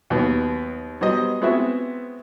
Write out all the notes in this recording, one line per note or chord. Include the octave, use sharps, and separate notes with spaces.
D#2 F#3 B3
F#3 G3 B3 C5 D#5
G#3 B3 C4 E4 F#4 E5